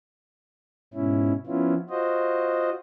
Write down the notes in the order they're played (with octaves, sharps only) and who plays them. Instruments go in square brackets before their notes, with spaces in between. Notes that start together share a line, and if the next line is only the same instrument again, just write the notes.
[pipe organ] G#2 B2 C#4 E4
F3 B3 C#4 E4 F4
F4 F#4 C5 D#5